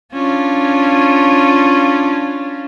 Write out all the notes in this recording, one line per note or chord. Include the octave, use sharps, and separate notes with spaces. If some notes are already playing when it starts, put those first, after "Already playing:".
C#4 D4 F4